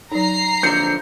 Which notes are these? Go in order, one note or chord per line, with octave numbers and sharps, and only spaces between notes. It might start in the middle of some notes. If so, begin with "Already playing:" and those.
F#3 D#4 A#5 C7
F2 D3 B4 G6 C#7